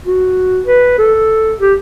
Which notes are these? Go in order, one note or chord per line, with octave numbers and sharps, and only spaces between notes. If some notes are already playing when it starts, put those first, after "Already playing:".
F#4
B4
A4
G4